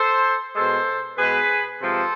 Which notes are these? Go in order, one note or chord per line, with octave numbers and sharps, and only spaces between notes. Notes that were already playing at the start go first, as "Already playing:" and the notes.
Already playing: A4 C5
B2 G#3 A4 C5
B2 G#3 G#4 B4
C3 F3 G#3 A4 C5